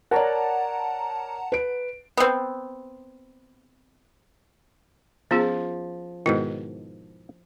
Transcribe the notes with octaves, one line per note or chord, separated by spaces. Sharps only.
A#4 C#5 D5 F#5 A5 A#5
B4 D7
B3 C4
F3 B3 C#4 G#4
G#2 B2 D#3 E4